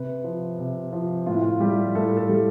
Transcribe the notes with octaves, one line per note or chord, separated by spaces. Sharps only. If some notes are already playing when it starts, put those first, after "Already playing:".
Already playing: C3 B4
F3
C3
F3
A2 F4
E4
F4
G3 G4
A2 A4
A4
G3